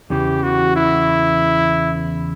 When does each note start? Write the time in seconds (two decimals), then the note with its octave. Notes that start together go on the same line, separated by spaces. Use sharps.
0.10 E2 C#3 E3 G4
0.43 F#4
0.76 E4